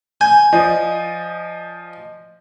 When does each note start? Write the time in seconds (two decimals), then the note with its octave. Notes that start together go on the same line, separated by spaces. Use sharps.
0.21 G#5 G6
0.53 F3 D5 D#5